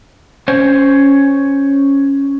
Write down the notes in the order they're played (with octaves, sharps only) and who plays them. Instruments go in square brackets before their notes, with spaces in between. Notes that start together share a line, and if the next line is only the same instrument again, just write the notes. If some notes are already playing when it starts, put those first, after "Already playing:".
[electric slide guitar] C#4 C5 C#5